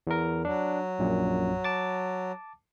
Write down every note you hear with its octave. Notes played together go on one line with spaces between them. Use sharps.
E2 A#4
F#3 D4
A#1 F#2 A#2
A5 D6 A6